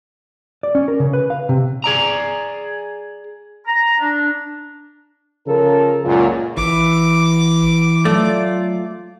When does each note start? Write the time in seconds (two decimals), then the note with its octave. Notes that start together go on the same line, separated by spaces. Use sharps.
0.63 D5
0.75 C#4
0.88 A#4
1.00 C#3
1.13 B4
1.30 F5
1.49 C3
1.84 G#4 D5 A#5
3.66 A#5
3.99 D4
5.47 C#3 F3 A4 A#4
6.05 C#2 F#2 A#2
6.57 A1 E3 D6
8.05 F#3 A3 F4 D5